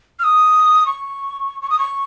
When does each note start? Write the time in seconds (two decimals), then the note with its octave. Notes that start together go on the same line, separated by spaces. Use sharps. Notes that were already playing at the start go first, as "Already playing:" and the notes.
0.19 F6
0.24 D#6
0.86 C#6
1.62 C#6
1.70 D#6
1.79 C#6